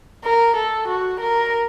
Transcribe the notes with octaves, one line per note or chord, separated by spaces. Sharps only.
A#4
A4
F#4
A#4